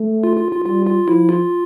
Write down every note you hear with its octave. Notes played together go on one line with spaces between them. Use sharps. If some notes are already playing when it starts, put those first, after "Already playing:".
Already playing: A3
F4
F4
F4
G3 F4
F4
F3 E4
F4